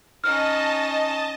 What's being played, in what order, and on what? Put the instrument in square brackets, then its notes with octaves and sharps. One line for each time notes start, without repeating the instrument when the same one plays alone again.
[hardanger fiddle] C#4 D#4 [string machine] D#5 A5 [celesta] F6